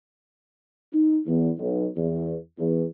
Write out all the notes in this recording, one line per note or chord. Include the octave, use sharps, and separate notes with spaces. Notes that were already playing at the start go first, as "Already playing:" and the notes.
D#4
E2
B1
E2
E2